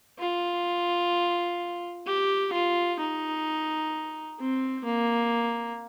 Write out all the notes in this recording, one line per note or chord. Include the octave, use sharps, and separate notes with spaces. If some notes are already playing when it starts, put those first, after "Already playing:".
F4
G4
F4
D#4
C4
A#3